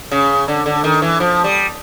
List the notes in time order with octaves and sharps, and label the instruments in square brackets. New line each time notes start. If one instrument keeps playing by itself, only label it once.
[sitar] C#3
D3
D3
D#3
E3
F3
G3